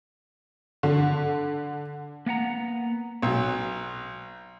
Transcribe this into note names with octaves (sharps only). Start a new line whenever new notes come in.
D3
A#3 B3 F#5 A#5
B1 F#3